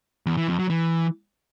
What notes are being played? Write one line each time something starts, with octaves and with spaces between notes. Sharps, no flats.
E2
E3
F2
F#3
E3